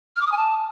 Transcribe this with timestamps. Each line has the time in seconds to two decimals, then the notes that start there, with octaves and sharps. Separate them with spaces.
0.16 F6
0.21 D6
0.26 D#6
0.32 G#5
0.37 A5